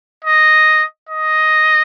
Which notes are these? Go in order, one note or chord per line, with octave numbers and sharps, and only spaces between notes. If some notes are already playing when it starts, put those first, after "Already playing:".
D#5
D#5